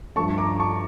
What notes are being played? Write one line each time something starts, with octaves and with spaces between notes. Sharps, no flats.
G2 F3 A3 A5 C#6
A#5 D6
A5 C#6